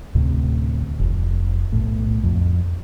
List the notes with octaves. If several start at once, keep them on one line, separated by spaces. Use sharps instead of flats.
D2 A2 C3
F1
B1 A2
F2